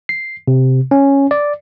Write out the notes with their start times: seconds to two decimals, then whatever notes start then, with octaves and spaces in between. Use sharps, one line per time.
0.09 C7
0.48 C3
0.91 C#4
1.31 D5